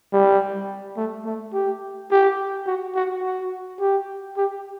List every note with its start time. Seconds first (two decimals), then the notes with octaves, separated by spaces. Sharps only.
0.13 G3
0.97 A3
1.25 A3
1.53 G4
2.11 G4
2.67 F#4
2.95 F#4
3.23 F#4
3.80 G4
4.37 G4